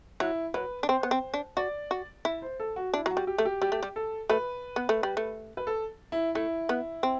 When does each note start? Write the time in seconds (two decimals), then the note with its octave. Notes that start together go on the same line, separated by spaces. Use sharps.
0.20 F#3 E4
0.54 F#3 B4
0.83 D4
0.89 C4 C5
1.03 B3
1.11 C4
1.34 D4
1.57 F#4 D5
1.91 F#4
2.25 E4 E5
2.42 C5
2.60 A4
2.76 F#4
2.94 D4 E4
3.06 F#3
3.11 F#4
3.17 G3
3.27 G4
3.38 A3
3.45 G4
3.62 G3 G4
3.72 A3
3.83 G3
3.96 A4
4.30 A3 B4
4.76 B3
4.89 A3
5.03 G3
5.17 A3
5.57 B4
5.67 A4
6.12 E4
6.35 A3 E4
6.69 B3
7.03 C4